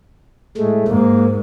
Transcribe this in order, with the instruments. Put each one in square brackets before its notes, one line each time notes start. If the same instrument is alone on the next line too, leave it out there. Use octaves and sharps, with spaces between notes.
[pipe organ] A2 G#3 A3
[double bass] G#2 [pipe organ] A#3